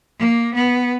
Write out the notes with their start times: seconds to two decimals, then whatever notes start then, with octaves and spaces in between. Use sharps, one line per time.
0.19 A#3
0.54 B3